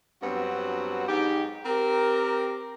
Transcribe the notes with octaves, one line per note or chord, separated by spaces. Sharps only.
G2 F#3 B3 C4 F#4
G#2 D#4 G4
C4 G4 A#4